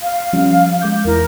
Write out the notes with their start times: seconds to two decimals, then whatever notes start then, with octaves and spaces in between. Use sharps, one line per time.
0.01 F5
0.33 F3 G3 C#4
0.82 G#3 D6 G6
1.05 E2 E4 A#4